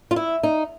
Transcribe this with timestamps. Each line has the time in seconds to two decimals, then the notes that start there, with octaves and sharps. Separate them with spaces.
0.11 F4
0.16 E4
0.43 D#4